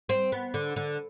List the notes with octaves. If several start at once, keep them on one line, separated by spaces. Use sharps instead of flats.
C4
B3
D3
D3